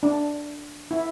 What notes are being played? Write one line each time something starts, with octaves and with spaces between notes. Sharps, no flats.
D4
E4